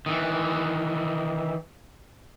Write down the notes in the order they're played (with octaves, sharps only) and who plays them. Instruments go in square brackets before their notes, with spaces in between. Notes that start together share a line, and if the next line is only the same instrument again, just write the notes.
[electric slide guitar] D#3 E3